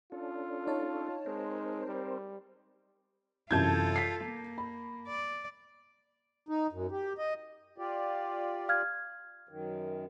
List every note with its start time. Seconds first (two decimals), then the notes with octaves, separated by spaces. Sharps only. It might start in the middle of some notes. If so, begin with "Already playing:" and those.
0.12 C#4 D4 F4 A4
0.67 D#4 C#5 A5
1.26 G#3 C4 A#4 C5
1.87 G3
3.51 F#2 C3 E3 F4 A4 A5 G6 G#6
3.96 B6 C7
4.24 A#3
4.58 B5
5.07 D5
6.49 D#4
6.72 F#2
6.92 G4
7.18 D#5
7.78 F4 G4 D5
8.69 F5 F6 G#6
9.49 F#2 D#3